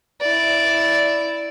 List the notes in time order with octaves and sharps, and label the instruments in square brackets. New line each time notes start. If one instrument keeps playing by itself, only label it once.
[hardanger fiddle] E4 D5